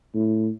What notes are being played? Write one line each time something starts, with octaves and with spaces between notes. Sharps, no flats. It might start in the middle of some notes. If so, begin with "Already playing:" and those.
A2